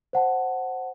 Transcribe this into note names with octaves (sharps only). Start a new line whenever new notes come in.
C5 F#5 A5